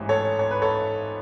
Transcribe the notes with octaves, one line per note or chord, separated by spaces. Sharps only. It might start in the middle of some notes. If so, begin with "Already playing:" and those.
Already playing: A1 G#2 E3
A4 C#5
C#5
B4
A4 C#5